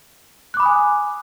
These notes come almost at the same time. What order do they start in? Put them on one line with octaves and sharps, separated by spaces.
F#6 D6 B5 D#6 G#5